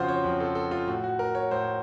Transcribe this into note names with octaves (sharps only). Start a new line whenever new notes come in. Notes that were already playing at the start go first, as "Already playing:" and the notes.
Already playing: F2 C#3 F4 F#4 C5
C#5
F2 C#3
A4
A4
F4
A2 F#4
F#4
A#4
C#5
A2 C5